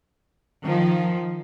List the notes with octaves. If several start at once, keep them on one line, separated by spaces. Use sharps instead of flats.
D#3 F3